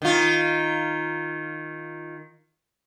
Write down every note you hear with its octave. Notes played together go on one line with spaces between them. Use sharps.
D#3 F4